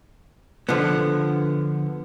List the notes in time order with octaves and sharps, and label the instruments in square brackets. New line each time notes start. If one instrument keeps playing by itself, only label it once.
[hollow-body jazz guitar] D3 F3 B3